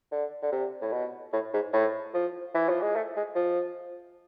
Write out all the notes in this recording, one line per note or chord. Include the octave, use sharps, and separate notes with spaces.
D3
D3
C3
A2
B2
A2
G#2
A2
F3
E3
F3
G#3
A3
G#3
F3